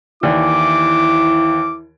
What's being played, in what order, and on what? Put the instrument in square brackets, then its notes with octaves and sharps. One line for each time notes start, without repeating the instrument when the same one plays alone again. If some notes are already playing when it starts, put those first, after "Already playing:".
[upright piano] D#2 E3 D5 [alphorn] E4 [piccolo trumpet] D6